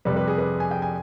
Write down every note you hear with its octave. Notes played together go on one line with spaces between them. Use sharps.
F2 C3 G3 B4
B4
G#4
B4
G#5
G5
G#5